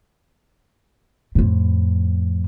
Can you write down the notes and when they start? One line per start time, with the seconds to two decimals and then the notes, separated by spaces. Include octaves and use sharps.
1.35 F2 A2